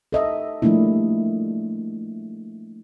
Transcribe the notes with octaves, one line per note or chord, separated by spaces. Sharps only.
A4 D#5 E5
F3 G3 A3 A#3 D4 E4